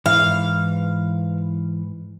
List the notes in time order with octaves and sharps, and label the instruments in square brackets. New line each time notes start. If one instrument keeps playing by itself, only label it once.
[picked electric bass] G#2 [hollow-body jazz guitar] E3 [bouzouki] F5